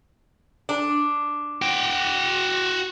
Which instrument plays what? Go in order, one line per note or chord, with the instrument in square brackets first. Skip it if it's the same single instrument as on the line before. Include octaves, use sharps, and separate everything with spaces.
[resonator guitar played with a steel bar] D4
[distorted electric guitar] F#4 G5